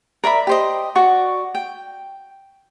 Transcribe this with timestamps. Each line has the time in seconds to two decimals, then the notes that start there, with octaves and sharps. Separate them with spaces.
0.24 A#4 D5 E5 B5
0.47 G4 C5 D#5
0.95 F#4 D5 C#6
1.55 G5